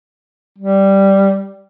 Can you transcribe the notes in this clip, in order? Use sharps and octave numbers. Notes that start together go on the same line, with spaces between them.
G3